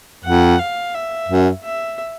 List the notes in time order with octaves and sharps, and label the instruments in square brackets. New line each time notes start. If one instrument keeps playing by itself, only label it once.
[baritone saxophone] F2 [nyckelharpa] F#5
[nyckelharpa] F5
E5
[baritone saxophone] F#2
[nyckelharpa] E5